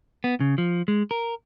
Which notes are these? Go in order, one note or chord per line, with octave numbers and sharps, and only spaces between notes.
B3
C#3
F3
G#3
A#4